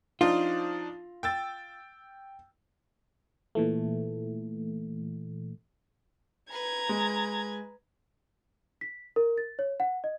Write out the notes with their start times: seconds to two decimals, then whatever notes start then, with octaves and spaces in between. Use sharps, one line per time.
0.21 F3 D4 D#4 F4
1.23 G5 E6 A6
3.55 A#2 E3 A3
6.52 B4 A#5 G#6
6.89 G#3
8.81 B6
9.16 A#4
9.38 A6
9.59 C#5
9.80 F#5
10.04 D#5